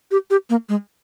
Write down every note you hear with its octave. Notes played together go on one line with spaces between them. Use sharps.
G4
G4
A#3
G#3